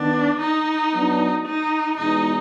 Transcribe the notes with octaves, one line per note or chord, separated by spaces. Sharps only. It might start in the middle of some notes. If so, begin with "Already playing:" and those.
Already playing: D#3 B3 D4
D#4
F#3 B3 D4
D#4
E2 B2 G#3 D#4